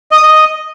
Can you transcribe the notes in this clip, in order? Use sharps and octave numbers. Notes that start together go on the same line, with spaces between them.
D#5
D#6
D#5